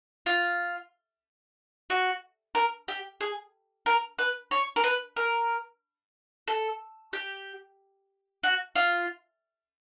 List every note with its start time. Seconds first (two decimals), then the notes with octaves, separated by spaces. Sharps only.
0.26 F4
1.90 F#4
2.55 A#4
2.88 G4
3.21 G#4
3.86 A#4
4.19 B4
4.51 C#5
4.76 A#4
4.84 B4
5.16 A#4
6.48 A4
7.13 G4
8.43 F#4
8.76 F4